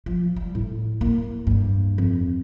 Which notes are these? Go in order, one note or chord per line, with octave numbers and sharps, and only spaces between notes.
F3
G3
A2
A#3
G2
F2